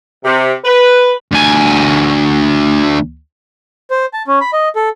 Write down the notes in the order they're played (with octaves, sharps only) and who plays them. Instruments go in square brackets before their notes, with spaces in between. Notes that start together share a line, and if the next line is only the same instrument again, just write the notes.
[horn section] C3
B4
[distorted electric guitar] D2 G#5
[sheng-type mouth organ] C5
A5
C#4
B5
D#5
A4